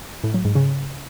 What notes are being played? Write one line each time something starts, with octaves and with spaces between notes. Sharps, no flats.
A2
F#3
G#2
C#3